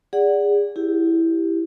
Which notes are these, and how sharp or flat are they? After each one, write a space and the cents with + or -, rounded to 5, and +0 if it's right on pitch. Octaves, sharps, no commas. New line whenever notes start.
G#4 -25 D5 -15 F#5 +5
E4 +0 G4 +0